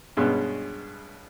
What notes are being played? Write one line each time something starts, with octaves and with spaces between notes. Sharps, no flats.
G2 B2 G#3 B3 C#4